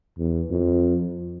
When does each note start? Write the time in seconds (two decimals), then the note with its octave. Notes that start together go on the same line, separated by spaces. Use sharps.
0.18 E2
0.51 F2